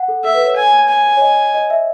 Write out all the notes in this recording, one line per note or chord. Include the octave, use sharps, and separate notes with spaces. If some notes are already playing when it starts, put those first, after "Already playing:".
Already playing: F#5
A4
A4 E5
B4
C#5
G#5
G#5
C#5
D#5
D#5
E5